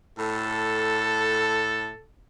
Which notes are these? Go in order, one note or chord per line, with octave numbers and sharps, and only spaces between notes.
A2 A4